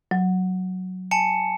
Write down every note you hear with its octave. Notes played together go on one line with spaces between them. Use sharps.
F#3
G#5 A5 C#7